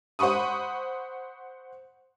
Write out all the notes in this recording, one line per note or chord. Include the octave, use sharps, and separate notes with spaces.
C5 F#5 B5 C#6 D#6